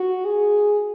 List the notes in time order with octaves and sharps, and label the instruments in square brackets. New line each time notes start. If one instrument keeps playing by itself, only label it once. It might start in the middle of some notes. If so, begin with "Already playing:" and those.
Already playing: [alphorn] F#4
G#4